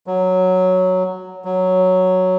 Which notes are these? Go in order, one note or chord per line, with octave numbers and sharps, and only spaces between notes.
F#3
F#3